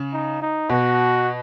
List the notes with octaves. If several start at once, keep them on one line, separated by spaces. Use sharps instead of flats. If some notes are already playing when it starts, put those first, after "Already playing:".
Already playing: C#3
D#4
D#4
B2 F#4